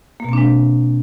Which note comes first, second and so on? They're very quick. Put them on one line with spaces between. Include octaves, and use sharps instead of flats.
A#3 B2 C4 D4 G#3